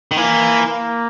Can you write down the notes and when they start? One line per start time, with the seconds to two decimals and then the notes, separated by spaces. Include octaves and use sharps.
0.11 D#3
0.17 E3 A#3
0.67 A#3